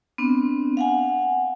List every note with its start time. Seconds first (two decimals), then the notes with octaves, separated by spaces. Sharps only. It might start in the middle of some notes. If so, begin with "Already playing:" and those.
0.18 B3 C4 D4
0.77 F5 F#5 G#5